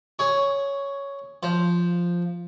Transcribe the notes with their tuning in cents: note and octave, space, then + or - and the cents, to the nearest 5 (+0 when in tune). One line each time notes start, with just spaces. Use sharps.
G#4 +0 C#5 +5
F3 +0 C5 +0